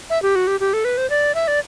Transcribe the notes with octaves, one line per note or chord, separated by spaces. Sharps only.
E5
G4
F#4
G4
G4
A4
B4
C5
D5
E5
D5